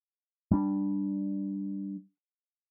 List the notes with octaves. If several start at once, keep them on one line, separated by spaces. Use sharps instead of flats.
G3 D4